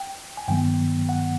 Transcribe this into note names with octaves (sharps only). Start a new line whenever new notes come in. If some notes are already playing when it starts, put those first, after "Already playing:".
Already playing: G5
G#5
G2 D#3 F#3 B3 G5
F#5